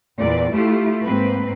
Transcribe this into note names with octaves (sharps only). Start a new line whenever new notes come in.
E2 A#2 D5
A3 E4 F4 G4
G#2 A#3 C4 B4